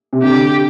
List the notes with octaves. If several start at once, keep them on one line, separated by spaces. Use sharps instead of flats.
C3
D3 G4